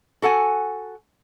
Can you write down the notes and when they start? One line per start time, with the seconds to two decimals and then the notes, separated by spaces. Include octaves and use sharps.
0.22 F#4 A4 F#5 G#5